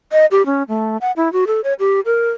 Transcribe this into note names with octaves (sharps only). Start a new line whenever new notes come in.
D#5
G4
C#4
A3
F#5
E4
F#4
A4
C#5
G4
A#4